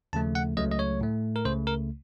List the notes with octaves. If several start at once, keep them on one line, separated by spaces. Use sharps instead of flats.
D#2 C#3 F3 A3 A5
F#5
C#2 C#3 F#3 A3 D#5
D#5
C#5
A2 A3
A#4
C#2 C#3 A3 C5
A#4